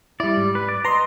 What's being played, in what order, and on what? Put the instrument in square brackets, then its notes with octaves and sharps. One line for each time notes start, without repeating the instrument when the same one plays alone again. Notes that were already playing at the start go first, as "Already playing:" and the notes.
[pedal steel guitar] G3 D5 [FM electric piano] E4
[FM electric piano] G#2
[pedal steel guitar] B4
D5
[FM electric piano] B4 C6 [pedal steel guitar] D#5 A#5